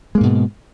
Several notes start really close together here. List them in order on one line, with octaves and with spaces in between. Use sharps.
G#3 A#3 G#2 B2